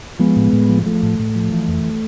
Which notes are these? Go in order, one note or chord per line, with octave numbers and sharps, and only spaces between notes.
F3 G#3 B3
A2
A2
F3
F3 A3
A2
A2
F3
E3
F2